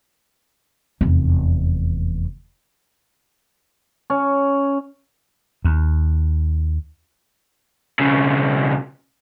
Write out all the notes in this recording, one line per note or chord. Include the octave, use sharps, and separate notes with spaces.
F1 E2
C#4
D#2
B1 C#3